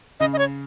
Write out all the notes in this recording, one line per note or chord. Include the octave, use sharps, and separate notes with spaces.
C#3 D#5
D#5
C#5